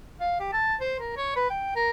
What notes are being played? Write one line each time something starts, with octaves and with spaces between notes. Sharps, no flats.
F5
G4
A5
C5
A#4
C#5
B4
G5
A#4